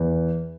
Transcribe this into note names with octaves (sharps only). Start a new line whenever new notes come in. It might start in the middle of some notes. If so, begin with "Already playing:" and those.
Already playing: E2